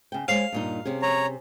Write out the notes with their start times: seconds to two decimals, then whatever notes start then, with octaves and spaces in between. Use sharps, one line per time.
0.12 C#3 G5
0.28 G#3 C5 C#5 F5
0.52 G2 A#2 D#4
0.85 C3 C#4 G#4
1.02 C#5 A#5